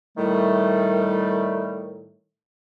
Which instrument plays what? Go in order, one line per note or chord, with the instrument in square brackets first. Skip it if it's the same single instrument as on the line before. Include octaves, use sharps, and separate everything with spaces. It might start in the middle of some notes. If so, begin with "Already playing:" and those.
[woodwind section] A2 D#3 G3 A3